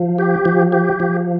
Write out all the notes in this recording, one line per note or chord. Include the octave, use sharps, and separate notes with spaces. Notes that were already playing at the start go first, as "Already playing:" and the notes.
Already playing: F3
G4
F3
G4
F3